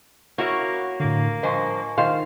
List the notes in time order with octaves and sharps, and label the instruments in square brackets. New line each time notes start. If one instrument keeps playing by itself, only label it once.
[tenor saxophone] A#3 [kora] C#4 E5 [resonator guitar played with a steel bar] E4 F#4 C#5
[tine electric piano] A2 D3 [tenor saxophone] A#3
[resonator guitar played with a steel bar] G2 F3 C5 [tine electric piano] D#5 G#5 C#6
[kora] D#3 F4 C5 [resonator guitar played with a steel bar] F5